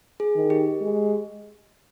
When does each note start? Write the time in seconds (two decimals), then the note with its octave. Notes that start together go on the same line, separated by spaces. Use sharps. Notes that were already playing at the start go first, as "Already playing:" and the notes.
0.20 G#4
0.36 D#3
0.50 G4
0.81 G#3